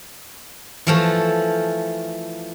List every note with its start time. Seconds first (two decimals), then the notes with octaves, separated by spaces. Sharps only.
0.87 E3 F3 A3